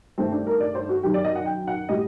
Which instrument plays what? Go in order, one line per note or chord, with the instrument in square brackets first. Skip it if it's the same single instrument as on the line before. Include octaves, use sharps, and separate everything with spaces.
[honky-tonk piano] G2 D#3 A3 C4
D4
A#4
D5
C5
F#4
F#2 D#3 F#3 G4
D5
D#5
F#5
G5
F#5
A2 G3 D#5